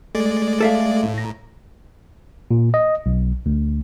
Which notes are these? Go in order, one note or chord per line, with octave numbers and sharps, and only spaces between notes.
G#3 A3 D5
A4 E5 F5
A2
A#5
A#2
D#5
B1
D2